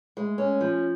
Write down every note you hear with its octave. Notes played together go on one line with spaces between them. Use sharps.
G#3
C#4
F3